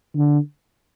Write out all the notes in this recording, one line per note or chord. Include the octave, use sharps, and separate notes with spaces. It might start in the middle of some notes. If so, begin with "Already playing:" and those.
D3